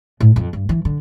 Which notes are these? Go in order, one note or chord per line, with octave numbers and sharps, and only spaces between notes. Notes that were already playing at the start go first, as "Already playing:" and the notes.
A2
F2
G2
E3
D3